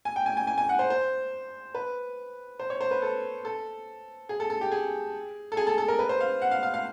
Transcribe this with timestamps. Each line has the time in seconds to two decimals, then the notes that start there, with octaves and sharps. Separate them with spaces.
0.05 G#5
0.16 G5
0.26 G#5
0.37 G#5
0.47 G#5
0.58 G#5
0.69 F#5
0.79 C5
0.90 C5
1.75 B4
2.60 C5
2.70 C#5
2.81 C5
2.91 B4
3.02 A4
3.45 A4
4.29 G#4
4.40 A4
4.50 A4
4.61 G4
4.72 G#4
5.52 A4
5.57 G#4
5.67 A4
5.78 A4
5.88 A#4
5.99 B4
6.09 C5
6.21 F5
6.42 F#5
6.51 F5
6.63 F5
6.74 F5